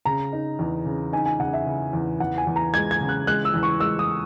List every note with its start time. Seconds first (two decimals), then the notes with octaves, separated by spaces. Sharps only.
0.05 C#3 A#5
0.33 D#4
0.59 E2
0.85 C#3
1.13 D#4 G#5
1.26 G#5
1.40 C#3 F#5
1.53 E5
1.66 C#3
1.93 E2
2.20 E2 F#5
2.38 G#5
2.47 E2
2.56 A#5
2.74 G#3 G#6
2.91 G#6
3.01 C#3
3.09 F#6
3.27 G#3 F#6
3.45 E6
3.54 E2
3.63 C#6
3.80 G#3 E6
3.99 D#6